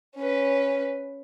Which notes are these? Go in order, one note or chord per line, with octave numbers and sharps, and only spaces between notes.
C#4 B4